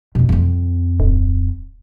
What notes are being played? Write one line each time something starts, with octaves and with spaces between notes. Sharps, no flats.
F2 B2
F2 C4
D1